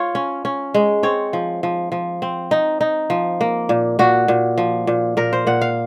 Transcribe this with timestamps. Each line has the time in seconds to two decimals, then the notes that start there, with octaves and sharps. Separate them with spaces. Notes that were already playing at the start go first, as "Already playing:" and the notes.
Already playing: F4 C#5
0.15 C#4
0.45 C#4
0.74 G#3
1.03 C4 C#5
1.33 F3
1.63 F3
1.92 F3
2.22 C4
2.51 D#4
2.81 D#4
3.10 F3
3.41 A#3
3.69 A#2
3.99 A#2 F#4
4.28 A#2
4.58 F3
4.87 A#2
5.17 A#2 A#4
5.33 C5
5.47 A#2 F#5
5.62 F5